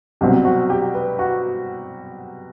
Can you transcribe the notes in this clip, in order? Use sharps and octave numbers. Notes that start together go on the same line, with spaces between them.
C2 B2 F#3 C4 G4
F#4
G4
B4
F#4